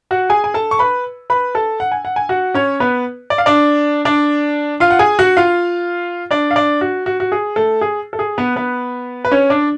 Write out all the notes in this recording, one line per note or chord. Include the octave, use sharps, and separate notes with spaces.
F#4 F#5
G#4 G#5
G#5
A4 A5
C#6
B4 B5
B4 B5
A4 A5
F#5
G#5
F#5
G#5
F#4 F#5
C#4 C#5
B3 B4
D5
F5
D4 D5
D4 D5
F4 F5
F#5
G#4 G#5
F#4 F#5
F4 F5
D4 D5
F5
D4 D5
F#4
F#4
F#4
G#4
A3 A4
G#4
A4
G#4
B3 B4
B3 B4
B4
C#4 C#5
D4 D5